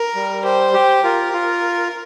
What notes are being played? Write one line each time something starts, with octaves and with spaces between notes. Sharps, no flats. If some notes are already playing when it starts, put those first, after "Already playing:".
Already playing: A#4
G3
G4 C5
G4
F4 A#4
F4